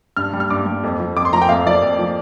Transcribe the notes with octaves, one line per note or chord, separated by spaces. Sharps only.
G2 F6
G3
F6
G2 D6
G3
F2
F3
F2 D6
C6
F3 A#5
G5
F2 F5
F3 D5
F2
F3